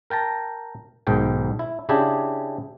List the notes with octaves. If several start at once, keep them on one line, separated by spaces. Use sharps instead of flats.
A#4 G5 A5 A#5
B1 G#2 D#3 G5
E4
C#3 D4 E4 G4 G#4